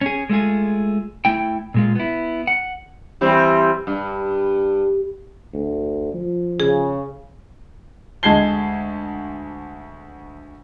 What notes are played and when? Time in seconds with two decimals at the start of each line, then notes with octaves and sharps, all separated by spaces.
0.01 C#4 G#4
0.29 G#3 A3 F4 G#4
1.25 A3 E4 G5
1.74 A#2 G#3 F4
1.95 B3 E4
2.47 F#5
3.21 E3 G3 C4
3.87 G2
5.54 D2
6.14 F3
6.60 C#3 G#4
8.23 D2 G#3 A5 G#6 C7 G7